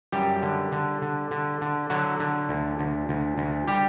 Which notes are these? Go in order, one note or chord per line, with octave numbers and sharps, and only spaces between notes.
F#2 G3 G4
D3
D3
D3
D3
D3
D3 F#3 F#4
D3
D2
D2
D2
D2
G3 G4